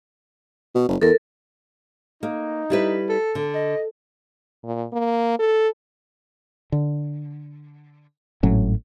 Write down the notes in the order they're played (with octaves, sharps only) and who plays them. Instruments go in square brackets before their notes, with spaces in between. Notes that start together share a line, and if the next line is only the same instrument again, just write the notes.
[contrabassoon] B2
F#1
[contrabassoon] E2 [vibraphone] A4 A#4
[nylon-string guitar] A#3 [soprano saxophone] D#4
[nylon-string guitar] G3 E4 B4
[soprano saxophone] A4
[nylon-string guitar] D3
[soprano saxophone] D#5
[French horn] A#2
A#3
A4
[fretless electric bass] D3
G#1 A2 F#3 C#4